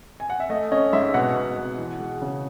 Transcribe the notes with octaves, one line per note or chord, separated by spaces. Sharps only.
G#5
F#5
E5
A3 D#5
C#4 D#5
G#2 E5
B2 F#5
B2
B2
E3
G#3
C#3